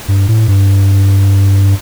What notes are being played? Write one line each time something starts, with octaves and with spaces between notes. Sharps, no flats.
G2
A2
G2